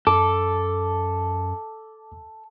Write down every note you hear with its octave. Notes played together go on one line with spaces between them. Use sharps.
F#2 A4 D6